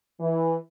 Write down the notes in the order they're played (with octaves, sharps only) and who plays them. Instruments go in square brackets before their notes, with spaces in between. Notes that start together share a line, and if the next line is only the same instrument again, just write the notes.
[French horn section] E3